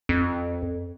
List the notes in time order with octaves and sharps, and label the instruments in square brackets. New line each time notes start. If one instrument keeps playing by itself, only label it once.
[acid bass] F2